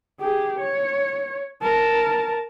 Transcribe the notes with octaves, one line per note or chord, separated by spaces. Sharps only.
G4 G#4
C#5
A#4 A5